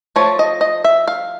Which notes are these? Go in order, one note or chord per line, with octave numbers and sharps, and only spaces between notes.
F3 A3 C#5
D#5
D#5
E5
F5